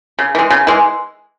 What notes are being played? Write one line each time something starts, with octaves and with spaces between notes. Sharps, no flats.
C#3
E3 G#3
C#3
E3 G#3